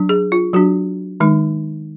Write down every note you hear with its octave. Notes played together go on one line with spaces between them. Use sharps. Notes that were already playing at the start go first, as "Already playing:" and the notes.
Already playing: F#3 D4
G#4
F4
F#3 D4 F#4
D#3 G#3 D#4